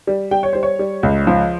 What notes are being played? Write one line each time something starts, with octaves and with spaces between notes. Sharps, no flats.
G3
G3 G5
C#5
G3 C5
C#5
G3
C#2
F3